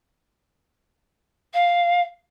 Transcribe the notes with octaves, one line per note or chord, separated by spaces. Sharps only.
F5